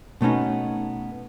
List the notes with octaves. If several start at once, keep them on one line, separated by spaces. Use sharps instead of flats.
B2 A3 B3 C#4 D#4